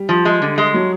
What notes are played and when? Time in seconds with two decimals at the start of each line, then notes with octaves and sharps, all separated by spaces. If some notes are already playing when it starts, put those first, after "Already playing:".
Already playing: G3
0.09 F3
0.25 G#3
0.42 D3
0.58 G#3
0.74 F#3